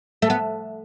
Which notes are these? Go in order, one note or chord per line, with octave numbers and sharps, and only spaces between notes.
A3
B3